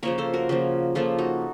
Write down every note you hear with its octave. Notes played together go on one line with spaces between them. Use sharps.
C#3 F3 A#3 A#4 C#5
A4 C5
F#4 A#4
C#3 F3 A#3
C#3 F3 A#3 F4 A4
D#4 F#4